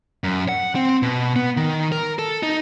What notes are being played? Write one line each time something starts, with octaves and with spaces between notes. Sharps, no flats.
F#2
F#5
C4
B2
B3
D#3
A#4
A4
D#4